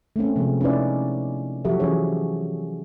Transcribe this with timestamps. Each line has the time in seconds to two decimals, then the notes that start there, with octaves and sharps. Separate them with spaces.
0.16 A3 A#3 C4 C#4
0.36 C3 F3 G#3 B3 C4
0.61 C#4 D#4 E4 B4 D5
1.65 F3 F#3 F#4 G4 A4 E5
1.80 E3 C#4 G4 G#4 C#5